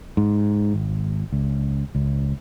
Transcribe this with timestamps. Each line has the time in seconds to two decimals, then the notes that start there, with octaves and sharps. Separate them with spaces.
0.17 G#2
0.74 G#1
1.32 C#2
1.95 C#2